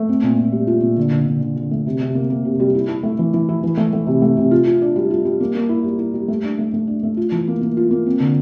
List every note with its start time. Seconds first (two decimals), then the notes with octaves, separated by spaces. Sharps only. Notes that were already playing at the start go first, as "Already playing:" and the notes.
Already playing: A3
0.09 C4
0.23 A#2
0.39 A#2
0.52 G3
0.67 F4
0.82 A#2
0.97 D3
1.11 D3
1.26 D3
1.41 D3
1.56 D3
1.71 A3
1.86 C3
2.01 C3
2.15 A#3
2.30 A#3
2.45 C3
2.60 G3
2.75 E4
2.89 E4
3.03 A3
3.19 E3
3.34 E3
3.49 E4
3.64 E3
3.77 A3
3.93 A3
4.07 C3
4.22 A3
4.37 C3
4.51 F4
4.67 F4
4.82 D4
4.96 G3
5.10 F4
5.25 G3
5.40 A#3
5.55 A#3
5.69 E4
5.84 G3
5.99 E4
6.14 G3
6.28 A3
6.43 D4
6.59 A3
6.74 A3
6.87 D4
7.03 A3
7.17 F4
7.32 E3
7.48 A#3
7.61 A#3
7.77 F4
7.91 A#3
8.06 C4
8.20 D3